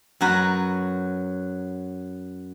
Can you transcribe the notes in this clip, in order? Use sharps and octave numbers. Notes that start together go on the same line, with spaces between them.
F#2 F#3 F#4 B4 A#5